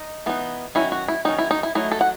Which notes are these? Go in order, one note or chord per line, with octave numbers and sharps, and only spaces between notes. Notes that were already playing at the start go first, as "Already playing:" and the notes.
Already playing: D#4
E3 B3 D#4
D#3 F#3 C#4 E4
F#4
E4
D#3 F#3 C#4 D#4
E4
D#4
E4
F#3 A3 D#4 E4
A4
F#5